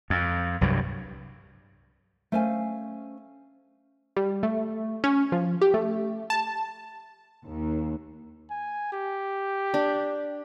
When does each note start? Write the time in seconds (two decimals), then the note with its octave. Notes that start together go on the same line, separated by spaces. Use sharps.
0.10 F2
0.61 C2 G2 F#3 G3
2.32 A3 C#4 C5 F5 G5 G#5
4.16 G3
4.43 A3
5.04 C#4
5.32 F3
5.61 G4
5.74 A3
6.30 A5
7.46 D#2
8.50 G#5
8.92 G4
9.74 D4